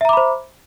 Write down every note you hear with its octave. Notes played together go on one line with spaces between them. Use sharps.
C5 E5 A#5 B5 D6